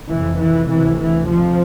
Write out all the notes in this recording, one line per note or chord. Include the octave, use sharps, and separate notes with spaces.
F2 C3 E3
E3
D2 C3 E3
E3
F2 C3 F3